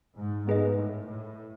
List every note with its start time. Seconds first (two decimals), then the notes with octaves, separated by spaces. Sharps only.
0.18 G#2
0.47 G#2 B3 D#4 G#4 B4 D#5
0.77 A2
1.06 A2